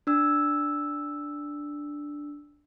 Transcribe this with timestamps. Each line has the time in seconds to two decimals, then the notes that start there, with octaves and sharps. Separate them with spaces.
0.07 D4 E6